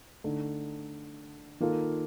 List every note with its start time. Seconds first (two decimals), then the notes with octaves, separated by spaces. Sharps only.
0.24 D3 A3 D#4 A4
1.60 D#3 A#3 F4 A4